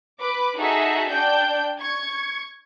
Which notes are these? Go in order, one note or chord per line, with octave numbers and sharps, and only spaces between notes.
B4 D6
D#4 F#4 G#4 A4 E5
D4 G5 G6
C#6 G#6